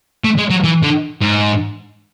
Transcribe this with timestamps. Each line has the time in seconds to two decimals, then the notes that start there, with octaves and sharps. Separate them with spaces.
0.24 A3
0.38 G#3
0.51 F#3
0.64 E3
0.83 D3
1.22 G#2